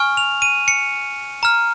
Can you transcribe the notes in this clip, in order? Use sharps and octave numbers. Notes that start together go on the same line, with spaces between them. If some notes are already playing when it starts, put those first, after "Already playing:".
Already playing: G#5 C#6 F6
F7
D#7
C#7
A#5 F6